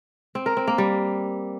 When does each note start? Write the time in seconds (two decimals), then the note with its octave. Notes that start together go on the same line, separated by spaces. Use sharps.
0.35 C4
0.46 A#4
0.57 C4
0.67 A#3
0.78 G3